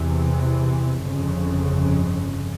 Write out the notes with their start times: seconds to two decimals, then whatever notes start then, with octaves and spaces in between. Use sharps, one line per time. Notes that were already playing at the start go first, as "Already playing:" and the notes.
Already playing: E2 C3 E3
1.05 G1 F2 C#3